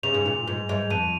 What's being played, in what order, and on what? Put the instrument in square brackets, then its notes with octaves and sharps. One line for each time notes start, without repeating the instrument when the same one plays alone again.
[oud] C#3 [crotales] F7
[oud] G#2
A#2
G#2
G#2
[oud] F2 [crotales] D#7